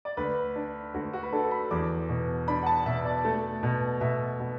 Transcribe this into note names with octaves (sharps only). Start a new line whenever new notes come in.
D5
D2 B4
D4
D2 F#4
F#4
B4
D4 A4
B5
E2 D6
B2
D4 B5
F#5
A5
B2 E5
D5
A3
B2
B2 E5
B2